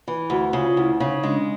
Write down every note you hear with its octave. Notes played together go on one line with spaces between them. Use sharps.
E3
D2 F#4
C#3 F4
D2 E4
C#3 D#4
C#4
G#3 D4